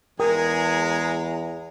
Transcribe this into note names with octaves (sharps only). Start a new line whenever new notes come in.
E2 G#3 G#4 A#4 G5 A#5 D#6